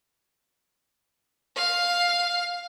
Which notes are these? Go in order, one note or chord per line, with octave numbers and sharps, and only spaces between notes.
F5